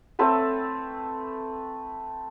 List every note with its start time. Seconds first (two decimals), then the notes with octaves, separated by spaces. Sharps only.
0.19 A3 C4 A4 B4